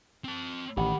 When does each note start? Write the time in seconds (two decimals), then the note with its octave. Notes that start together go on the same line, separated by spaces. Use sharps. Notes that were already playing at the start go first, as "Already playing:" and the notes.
0.24 C4 A5
0.77 A1 D#3 G4 F#5 B5